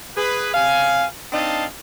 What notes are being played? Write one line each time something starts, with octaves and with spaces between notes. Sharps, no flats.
G#4 B4
C3 F5 G#5
C4 D4 D#4 D#5 F5 A5